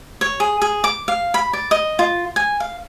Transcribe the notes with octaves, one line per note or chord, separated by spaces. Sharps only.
C#5
G#4
G#4
D6
F5
B5
D5
D#5
F4
G#5
F5